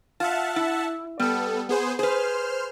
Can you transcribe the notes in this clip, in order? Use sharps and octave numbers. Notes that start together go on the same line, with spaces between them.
F4 E5 F#5 A5
E4
G3 B3 A4
B3 G#4 C5
G#4 B4 C5 F6